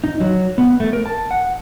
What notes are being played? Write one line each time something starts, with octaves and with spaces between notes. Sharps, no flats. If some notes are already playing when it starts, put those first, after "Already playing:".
D#4
F#3
B3
A3
A#4
A5
F#5